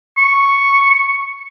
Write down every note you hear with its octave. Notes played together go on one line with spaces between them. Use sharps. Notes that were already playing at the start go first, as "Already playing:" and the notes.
C#6